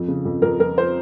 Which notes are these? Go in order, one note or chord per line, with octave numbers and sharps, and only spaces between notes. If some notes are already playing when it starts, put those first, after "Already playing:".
Already playing: F2 F3
C#3
F2
F2 A#4
F2 A#4
F3 C5